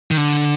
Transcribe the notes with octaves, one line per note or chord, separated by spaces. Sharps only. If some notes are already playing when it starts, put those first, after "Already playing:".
D#3
D3